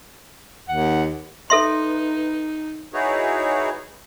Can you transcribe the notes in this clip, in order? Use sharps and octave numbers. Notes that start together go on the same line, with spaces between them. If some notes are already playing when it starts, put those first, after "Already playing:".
D#2 F#5
D#4 A4 B4 E5 C6
D#4 E4 F#4 G#4 B4 C#5